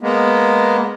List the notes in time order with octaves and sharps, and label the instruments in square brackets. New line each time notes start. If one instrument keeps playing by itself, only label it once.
[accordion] G#3 A#3 B3